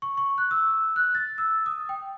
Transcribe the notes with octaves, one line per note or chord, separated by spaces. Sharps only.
C#6
C#6
F#6
E6
F#6
A6
E6
D#6
G5